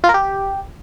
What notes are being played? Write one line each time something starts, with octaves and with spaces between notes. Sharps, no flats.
F4
A#4
G4